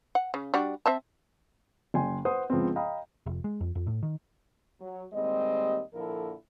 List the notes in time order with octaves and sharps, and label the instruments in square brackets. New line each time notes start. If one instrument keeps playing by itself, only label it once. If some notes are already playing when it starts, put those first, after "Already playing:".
[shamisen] F#5
C#3
G3 D4 F#4
C4 E5 A5
[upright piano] F#1 G5 G#5 C6
B4 C5 F#5 D#6
C#2 F3 B3 C4
D#5 F5 G5 A#5 B5 D#6
[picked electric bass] F1
G#3
F2
F2
A2
D#3
[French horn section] F#3
D#2 G3 G#3 C4 D#5
A#2 D3 F3 E4 A4 A#4